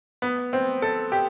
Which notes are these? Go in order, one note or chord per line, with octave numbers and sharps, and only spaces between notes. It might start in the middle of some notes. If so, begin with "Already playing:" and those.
B3
C4
A4
G4